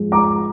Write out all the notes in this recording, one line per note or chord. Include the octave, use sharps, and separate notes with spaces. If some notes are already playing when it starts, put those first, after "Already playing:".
Already playing: G#2 F3 G#3
A#5 D6